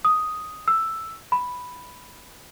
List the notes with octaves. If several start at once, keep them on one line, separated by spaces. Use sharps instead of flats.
D#6
E6
B5